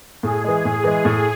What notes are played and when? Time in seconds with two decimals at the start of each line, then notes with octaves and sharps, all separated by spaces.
0.23 A2 G#4
0.44 E3 G#3
0.65 A2
0.84 E3 G#3
1.05 A2